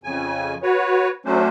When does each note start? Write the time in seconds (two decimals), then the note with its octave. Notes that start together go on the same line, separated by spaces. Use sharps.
0.04 F2 C#3 G#5
0.63 F#4 B4 C#5
1.25 F#3 A3 C#4 D4 C5